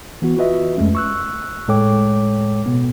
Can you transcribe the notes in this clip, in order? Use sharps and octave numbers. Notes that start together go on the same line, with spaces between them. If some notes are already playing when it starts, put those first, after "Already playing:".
E3 B3 F#4
F4 F#4 B4 D#5 E5
F2 G#3 A3 C#4
C#6 E6 F#6
A2 G#3 A4 C#5 G5 D6
B2 B3